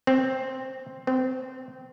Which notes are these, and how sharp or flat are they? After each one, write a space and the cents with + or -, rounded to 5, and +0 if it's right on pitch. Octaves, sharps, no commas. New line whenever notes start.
C4 +5
C4 -20